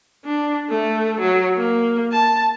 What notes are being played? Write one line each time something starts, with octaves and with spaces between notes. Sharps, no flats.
D4
A3
F#3
A#3
A5